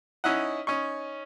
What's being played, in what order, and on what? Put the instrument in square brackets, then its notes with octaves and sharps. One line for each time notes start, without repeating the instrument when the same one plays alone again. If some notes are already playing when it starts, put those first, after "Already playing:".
[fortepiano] C#4 D#4 E4 D#5 F#5
C#4 D#4 C#6